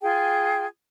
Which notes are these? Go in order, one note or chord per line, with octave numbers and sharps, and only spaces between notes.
F4 G#4 G5 G#5